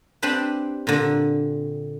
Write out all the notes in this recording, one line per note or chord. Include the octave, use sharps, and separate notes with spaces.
C4 D4 G4 B4
A#2 D3